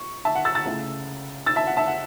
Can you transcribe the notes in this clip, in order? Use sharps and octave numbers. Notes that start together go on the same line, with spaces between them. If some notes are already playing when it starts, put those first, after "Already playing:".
Already playing: C#6
E5 A5
F#5
E6 A6
E6 A6
C#2 C#3 A3 E4
E6 A6
E5 A5
F#5
E5 A5
F#5